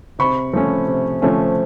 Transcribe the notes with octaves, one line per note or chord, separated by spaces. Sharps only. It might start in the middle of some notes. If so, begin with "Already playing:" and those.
C3 B5 C#6
F3 A3 C#4
C3
F3 A3 C#4